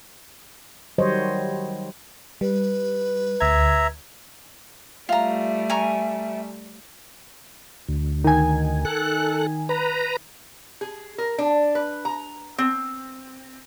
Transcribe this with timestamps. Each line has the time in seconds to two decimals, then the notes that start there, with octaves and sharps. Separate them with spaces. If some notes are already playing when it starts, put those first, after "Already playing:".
0.98 D#3 F#3 G3 C5 C#5 D#5
2.41 G3 B4
3.41 D2 E5 A#5 G#6
5.09 G3 A3 F4 E5 A#5
5.70 G#5 A#5 C#6
7.88 D2
8.24 D#3 G#5
8.85 A4 F#6
9.69 B4 A#5
10.81 G#4
11.18 A#4
11.38 D4
11.75 B4
12.05 A#5
12.58 C4